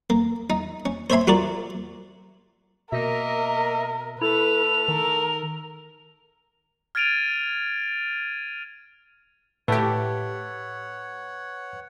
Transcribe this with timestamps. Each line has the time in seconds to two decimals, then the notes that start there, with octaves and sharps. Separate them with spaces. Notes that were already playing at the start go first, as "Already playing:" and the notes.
0.10 A#3
0.50 D#4
0.86 C#4
1.10 C5 C#5 E5 G#5 B5 C6
1.27 F4 F#4 A#4 D5
2.92 B2 A#3 A#4 D#5 E5
4.21 A3 E4 A4 B4 F7
4.88 D#3 A#4
6.95 F6 G#6 A6 D7 D#7 F7
9.68 A2 A3 G4 B4 C#5 F#5